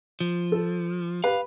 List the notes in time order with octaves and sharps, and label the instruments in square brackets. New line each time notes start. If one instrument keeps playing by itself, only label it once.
[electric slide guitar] F3
[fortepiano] A4
[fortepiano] G4 B4 [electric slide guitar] F5